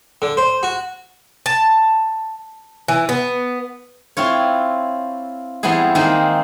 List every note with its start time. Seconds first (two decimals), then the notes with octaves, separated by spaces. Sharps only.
0.22 D3
0.37 C5
0.63 F#4
1.46 A5
2.88 E3
3.09 B3
4.17 C4 E4 F4 C#5
5.63 E3 G3 B3 C4 E4 G#4
5.95 D#3 G#3 A#3 C4